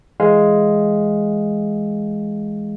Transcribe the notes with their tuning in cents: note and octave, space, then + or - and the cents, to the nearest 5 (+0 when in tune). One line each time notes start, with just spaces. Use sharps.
E3 +0 G#3 +0 F5 +0